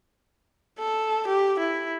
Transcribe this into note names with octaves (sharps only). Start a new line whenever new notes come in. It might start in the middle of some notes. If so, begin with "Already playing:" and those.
A4
G4
E4